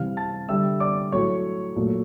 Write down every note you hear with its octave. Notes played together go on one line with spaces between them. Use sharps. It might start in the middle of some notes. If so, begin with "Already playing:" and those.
Already playing: C3 E3 G3 F5 F6
A5 A6
D3 G3 E5 E6
D5 D6
A2 F#3 A3 C#5 C#6
A#2 F#3 A3